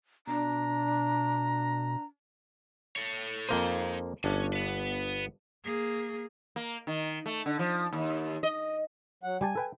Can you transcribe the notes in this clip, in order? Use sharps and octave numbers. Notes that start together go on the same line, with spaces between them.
B2 D4 A#5
A4 C#5
F2 A#3 D#4 C5 C6
G1 C#4 D4
B3 B4
A#3 G#4
A#3
D#3
A3
D3
F3
D#2
D#5
F#3 F#5
G3 G4 G#5 A5
A4 B4 G5